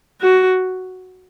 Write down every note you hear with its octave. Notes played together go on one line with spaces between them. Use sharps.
F#4